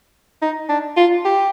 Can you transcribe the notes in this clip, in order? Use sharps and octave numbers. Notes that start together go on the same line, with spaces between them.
D#4
D4
F4
G4